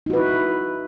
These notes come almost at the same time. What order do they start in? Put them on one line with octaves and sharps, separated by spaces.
D#4 F#4 B4 E4